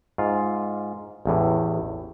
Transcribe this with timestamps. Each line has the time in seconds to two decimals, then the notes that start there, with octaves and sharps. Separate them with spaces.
0.18 G#2 F4
1.26 A1 E2 A2